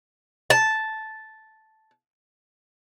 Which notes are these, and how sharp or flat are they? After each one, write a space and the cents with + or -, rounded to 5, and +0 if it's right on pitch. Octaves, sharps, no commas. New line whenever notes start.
A5 -5